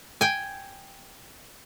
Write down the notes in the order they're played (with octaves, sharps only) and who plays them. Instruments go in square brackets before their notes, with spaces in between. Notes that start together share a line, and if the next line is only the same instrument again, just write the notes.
[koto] G5 G#5